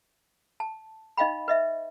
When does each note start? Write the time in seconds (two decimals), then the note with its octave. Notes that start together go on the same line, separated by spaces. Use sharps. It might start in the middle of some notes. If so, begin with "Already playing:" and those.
0.60 A5
1.17 D#4 D#5 F5 G5 B5
1.48 B4 D#5 E5